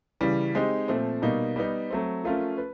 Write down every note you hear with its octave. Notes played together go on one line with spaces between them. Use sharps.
C#3 E3 G3
G#3 C4 D#4 G4
A#2 F3 A3 C4
B2 G3 A#3 D#4
G3 B3 D#4
F#3 A3 C4
F3 A3 C#4 F4 A#4
B4